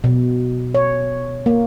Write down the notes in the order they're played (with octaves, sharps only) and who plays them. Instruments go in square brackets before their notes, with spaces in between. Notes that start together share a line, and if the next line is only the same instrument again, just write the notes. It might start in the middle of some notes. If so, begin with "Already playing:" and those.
[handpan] B2
C#5
A#3